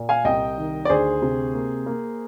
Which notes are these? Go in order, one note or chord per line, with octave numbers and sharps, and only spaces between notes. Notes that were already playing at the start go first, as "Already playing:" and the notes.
Already playing: A#2
F5 G#5
C2 D#5 G5
D#3
D5
D2 G#4 C5
C3
A#3
A#3